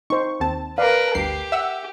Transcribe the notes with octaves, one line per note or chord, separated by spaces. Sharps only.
D#4 C5 C#6
D#2 C4 A5
A#4 B4 D5 F5
G1 D2 G4 C7
E5 F#5 E6